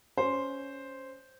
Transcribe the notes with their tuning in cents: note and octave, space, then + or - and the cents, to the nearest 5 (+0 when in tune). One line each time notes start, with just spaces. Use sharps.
C#4 +10 C5 +0